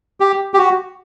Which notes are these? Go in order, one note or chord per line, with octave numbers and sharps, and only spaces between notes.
G4
G4
F#4